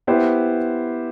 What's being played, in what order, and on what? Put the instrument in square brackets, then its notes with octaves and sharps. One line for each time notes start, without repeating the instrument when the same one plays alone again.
[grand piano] B3 E4 G4 C5